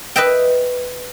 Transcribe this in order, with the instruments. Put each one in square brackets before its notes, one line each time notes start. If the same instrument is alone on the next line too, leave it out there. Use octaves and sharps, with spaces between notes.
[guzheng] B4 D#5 E5 G5